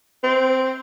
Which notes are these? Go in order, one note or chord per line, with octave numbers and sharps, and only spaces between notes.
C4